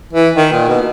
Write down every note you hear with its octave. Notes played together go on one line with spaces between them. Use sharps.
E3
D#3
A#2
B2